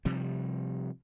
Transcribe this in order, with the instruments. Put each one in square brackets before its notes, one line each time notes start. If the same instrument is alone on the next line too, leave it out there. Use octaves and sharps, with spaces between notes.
[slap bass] C3 F3 G3